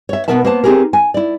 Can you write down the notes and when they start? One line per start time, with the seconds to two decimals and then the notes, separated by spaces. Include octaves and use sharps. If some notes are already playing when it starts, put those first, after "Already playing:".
0.09 C#5 E5
0.28 B2 F#3 B3 A#4 E5 A5
0.45 A#3 B3 C5 A5
0.64 C4 D#4 F4 G4 G#4 A#4
0.93 G#5
1.14 E4 D5